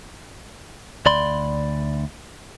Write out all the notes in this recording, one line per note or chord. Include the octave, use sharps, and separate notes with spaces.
D2 D5 B5 C6